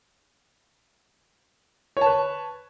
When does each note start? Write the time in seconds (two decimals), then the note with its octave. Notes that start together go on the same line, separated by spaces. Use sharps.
1.97 C#5
2.01 A5
2.06 B4